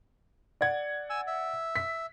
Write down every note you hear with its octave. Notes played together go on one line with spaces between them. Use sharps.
D5 F#5 G#6
G#5 E6
E5
B6